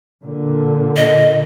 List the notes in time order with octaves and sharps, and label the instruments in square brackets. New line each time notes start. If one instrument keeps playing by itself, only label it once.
[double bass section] A#2 D3
[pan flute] D#5